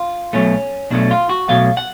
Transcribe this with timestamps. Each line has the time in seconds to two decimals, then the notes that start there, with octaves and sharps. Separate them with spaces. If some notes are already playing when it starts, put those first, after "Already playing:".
Already playing: F4
0.33 B1 B2 F#3 A3 C#4
0.90 B1 B2 F#3 A3 D4
1.11 F4
1.30 F#4
1.49 B1 B2 F#3 A3 F5
1.77 F#5